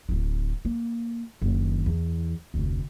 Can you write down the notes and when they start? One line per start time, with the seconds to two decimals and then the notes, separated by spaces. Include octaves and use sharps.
0.09 D1 E4
0.65 A#3
1.42 F#1 D#3
1.86 E2
2.54 F1 D2